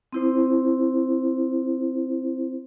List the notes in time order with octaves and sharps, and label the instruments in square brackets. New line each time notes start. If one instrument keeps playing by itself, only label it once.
[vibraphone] C4 E4 C5